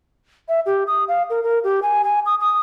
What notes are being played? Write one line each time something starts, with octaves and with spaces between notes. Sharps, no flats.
E5
G4
D#6
F5
A#4
A#4
G4
G#5
G#5
D#6
D#6